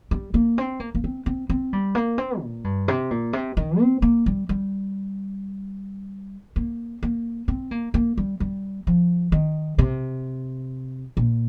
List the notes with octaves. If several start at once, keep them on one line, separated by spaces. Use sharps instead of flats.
G3
A#3
C4
A#3
A#3
C4
C4
C4
G3
A#3
C4
A#2
G2
C3
A#2
C3
D#3
C4
A#3
G3
G3
A#3
A#3
C4
A#3
A#3
G3
G3
F3
D#3
C3
A#2